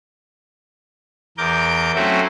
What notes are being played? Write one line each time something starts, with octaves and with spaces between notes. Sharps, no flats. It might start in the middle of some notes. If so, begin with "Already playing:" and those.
E2 A#4 D6 G6
F#3 A3 C4 C#4 E4 F#4